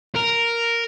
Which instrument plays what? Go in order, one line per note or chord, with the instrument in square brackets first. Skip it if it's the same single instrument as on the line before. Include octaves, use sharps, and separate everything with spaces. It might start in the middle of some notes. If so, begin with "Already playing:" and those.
[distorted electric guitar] A#4